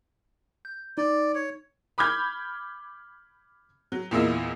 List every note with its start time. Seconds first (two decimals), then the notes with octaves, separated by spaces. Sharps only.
0.65 G6
0.98 D#4 D5
1.35 C#5
1.98 B5 D6 F6 G6 G#6
3.92 F#3
4.11 E2 A#2 A#3 E4 D#5